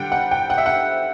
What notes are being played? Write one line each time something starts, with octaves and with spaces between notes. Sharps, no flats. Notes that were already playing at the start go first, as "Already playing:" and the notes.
Already playing: D3 G3 D4 F#5 G5
F#5
G5
F#5
E5
F#5